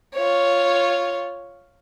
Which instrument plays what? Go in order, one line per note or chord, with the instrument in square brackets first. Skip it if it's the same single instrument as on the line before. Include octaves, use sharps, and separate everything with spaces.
[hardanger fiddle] F4 C#5